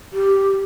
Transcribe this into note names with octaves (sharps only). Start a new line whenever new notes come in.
G4